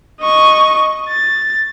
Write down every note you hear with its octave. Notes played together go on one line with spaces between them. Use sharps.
D#5 C#6
A6